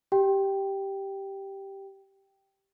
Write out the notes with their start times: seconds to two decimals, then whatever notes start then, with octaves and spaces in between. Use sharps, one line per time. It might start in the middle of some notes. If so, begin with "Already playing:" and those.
0.12 G4 G5